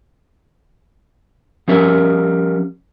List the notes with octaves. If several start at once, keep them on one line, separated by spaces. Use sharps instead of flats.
F3 G3 C#4 A#4 E5